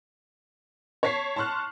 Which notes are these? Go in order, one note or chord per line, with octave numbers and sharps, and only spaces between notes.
C#5 A5 B6 C7
A5 C6 C#6 F6 F#6